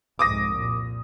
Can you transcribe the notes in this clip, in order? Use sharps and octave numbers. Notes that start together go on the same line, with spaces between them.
C2 F2 G#2 D6 D#6 A#6
A#2